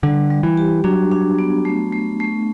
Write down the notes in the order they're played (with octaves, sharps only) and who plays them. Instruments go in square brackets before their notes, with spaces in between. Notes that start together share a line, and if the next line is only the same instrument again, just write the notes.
[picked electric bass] D3 [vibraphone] G3
[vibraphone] G3
[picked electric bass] E3
[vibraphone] G4
[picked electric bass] F#3 [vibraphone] D4
[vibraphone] D4
B3
A3
A3
A3